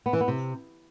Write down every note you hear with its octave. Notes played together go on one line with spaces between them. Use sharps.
B3
E3
B3
C3